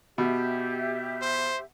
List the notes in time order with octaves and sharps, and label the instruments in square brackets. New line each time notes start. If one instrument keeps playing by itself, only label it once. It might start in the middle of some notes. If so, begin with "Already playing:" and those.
[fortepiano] B2 [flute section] G4 E5
[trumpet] C5